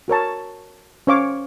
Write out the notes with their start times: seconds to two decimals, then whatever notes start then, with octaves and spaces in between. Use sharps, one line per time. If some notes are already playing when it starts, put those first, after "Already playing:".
0.08 F#4 A#4 C#5 A5
1.07 C#4 C5 C#5 F5 D6